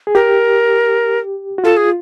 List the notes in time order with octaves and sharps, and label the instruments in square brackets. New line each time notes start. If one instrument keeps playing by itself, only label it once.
[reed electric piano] G#4
[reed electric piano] G4 [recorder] A#4
[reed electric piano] F#4
[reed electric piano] F4 [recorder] A4
[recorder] G#4